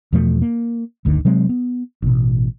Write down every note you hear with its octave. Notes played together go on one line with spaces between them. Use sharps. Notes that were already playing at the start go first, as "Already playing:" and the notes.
E2 B2 F3 A3
A#3
G1 D2 D3 D#3
C3 F#3 G#3 C4
B3
A1 B2